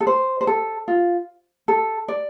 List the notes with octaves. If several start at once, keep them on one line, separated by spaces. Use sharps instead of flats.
A4
C5
C5
A4
F4
A4
D5